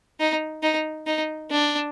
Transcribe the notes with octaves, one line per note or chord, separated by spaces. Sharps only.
D#4
D#4
D#4
D4